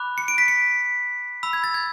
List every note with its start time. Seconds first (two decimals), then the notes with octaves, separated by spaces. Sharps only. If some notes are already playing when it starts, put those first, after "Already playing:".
Already playing: B5 D6 F#6
0.18 C#7
0.28 D7
0.38 B6
0.48 C#7
1.43 B5 E6
1.53 G#6
1.64 A6
1.74 G#6